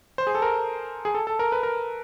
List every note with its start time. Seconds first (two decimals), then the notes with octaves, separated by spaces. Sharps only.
0.18 C5
0.27 G#4
0.35 A4
0.42 A#4
1.05 G#4
1.15 A4
1.27 A4
1.39 A#4
1.52 B4
1.63 A#4